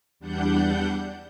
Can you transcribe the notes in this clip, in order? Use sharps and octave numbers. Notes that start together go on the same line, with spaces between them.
E2 G3 D4 F#5 G6